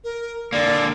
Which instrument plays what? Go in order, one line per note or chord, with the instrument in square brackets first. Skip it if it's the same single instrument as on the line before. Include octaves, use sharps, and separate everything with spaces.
[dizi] A#4
[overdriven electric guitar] D3 A#3 [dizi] D5